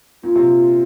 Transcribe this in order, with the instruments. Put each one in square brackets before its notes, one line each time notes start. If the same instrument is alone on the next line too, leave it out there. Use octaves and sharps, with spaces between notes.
[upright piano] A#2 [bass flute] F4
[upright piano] C3
A#2